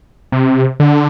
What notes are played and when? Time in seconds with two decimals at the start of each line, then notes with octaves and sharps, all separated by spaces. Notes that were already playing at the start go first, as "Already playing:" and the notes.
0.32 C3
0.80 D3